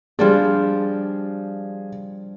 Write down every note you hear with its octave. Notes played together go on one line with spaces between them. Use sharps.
F3 G3 D4 G#4